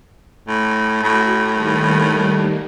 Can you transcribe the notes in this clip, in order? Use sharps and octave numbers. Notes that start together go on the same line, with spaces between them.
A2
A2 F#4
D#3 G3 A#3